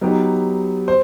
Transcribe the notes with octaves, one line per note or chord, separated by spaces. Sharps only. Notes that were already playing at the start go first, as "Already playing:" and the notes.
F#3 B3 D#4 G4
C5